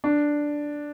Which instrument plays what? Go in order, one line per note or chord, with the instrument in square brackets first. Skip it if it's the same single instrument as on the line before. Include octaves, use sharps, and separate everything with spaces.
[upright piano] D4